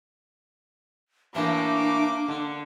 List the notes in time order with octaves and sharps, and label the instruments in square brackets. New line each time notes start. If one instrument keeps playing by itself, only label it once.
[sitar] A2 E3 A3 [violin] A#3 D6 [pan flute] D4
[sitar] D3